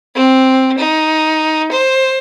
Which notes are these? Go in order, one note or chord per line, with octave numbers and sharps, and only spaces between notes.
C4
D#4
C5